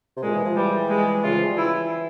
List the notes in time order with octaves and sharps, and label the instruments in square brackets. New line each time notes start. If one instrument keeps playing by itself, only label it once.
[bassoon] C3
[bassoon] A#2 [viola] G#3
[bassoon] E3
F3
[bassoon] E3 [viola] G3
[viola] G#3
[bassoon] C#3 [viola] F4
[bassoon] F3
G3
[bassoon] E3 [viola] E4